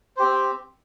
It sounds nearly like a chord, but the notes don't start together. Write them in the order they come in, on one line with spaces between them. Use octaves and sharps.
C5 G4 C4